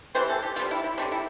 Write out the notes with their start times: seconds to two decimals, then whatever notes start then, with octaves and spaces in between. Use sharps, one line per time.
0.15 E3 G3 C4 C5
0.29 A4
0.43 G4
0.56 C4 F4
0.59 D3 G3
0.71 E4
0.84 E4
0.98 D3 G3 C4 D4
1.12 E4